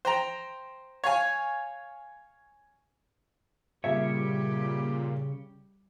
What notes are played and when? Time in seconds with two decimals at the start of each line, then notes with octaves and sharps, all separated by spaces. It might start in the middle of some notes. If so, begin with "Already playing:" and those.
0.05 C5 G5 A#5
1.04 C#5 F5 G#5
3.84 A#2 C#3 G3 G4 C#5 E5